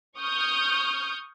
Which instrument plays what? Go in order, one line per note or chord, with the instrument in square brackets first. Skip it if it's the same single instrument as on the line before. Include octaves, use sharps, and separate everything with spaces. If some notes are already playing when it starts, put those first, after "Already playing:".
[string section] C#6 D#6 F6 G6